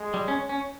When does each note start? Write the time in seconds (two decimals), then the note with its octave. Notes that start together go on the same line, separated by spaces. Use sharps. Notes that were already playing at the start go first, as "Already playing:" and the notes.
Already playing: G#3
0.14 G3
0.28 C#4
0.49 C#4